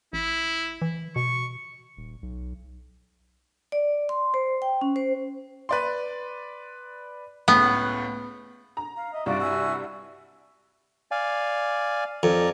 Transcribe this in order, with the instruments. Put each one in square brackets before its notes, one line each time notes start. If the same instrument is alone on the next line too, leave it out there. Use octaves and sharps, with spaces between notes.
[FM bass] A1 [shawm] E4
[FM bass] E3
[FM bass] B2 [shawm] C#6
[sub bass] D#1
B1
[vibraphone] D5
C6
C5
G5
C#4
C5
[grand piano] B4 D5 C6
[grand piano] C#2 A2 F#5 [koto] B3
[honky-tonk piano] A#5
[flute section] F5
[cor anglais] D#5 [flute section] E5
[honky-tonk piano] C2 G2 [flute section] F4 D5 E5 [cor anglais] F#4
[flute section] E5 G#5 E6
[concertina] D5 F5 G#5
[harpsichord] F2 [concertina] D5 A#5